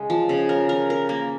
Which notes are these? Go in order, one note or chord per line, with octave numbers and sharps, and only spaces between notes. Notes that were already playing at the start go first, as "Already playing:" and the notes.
Already playing: C#3 G#3
F3
C#3
A#4
A#4
A#4
A#3